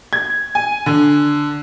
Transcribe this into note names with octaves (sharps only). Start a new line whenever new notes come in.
G#6
G#5
D3